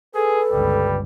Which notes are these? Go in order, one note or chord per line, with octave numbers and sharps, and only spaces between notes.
G#4 A4 B4
G1 C#2 G3